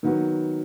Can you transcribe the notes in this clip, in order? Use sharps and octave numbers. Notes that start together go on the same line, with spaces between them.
D#3 F#3 B3